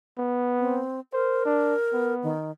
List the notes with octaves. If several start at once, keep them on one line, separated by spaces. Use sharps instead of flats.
B3
C4
A#4 C5
D4
B3
D#3